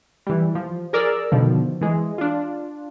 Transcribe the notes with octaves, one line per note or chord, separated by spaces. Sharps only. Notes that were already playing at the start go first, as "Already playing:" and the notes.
E3 G3
F3
G#4 A#4 D5 E6
B2 D3 D#3 F3
E3 G#3
D4 F4